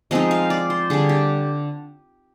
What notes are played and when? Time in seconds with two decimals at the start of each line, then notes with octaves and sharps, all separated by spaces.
0.11 F3 G#3 C4 D#4 D#5
0.31 F5
0.50 D5
0.70 C5
0.90 D3 G3 D4 G#4
1.09 G4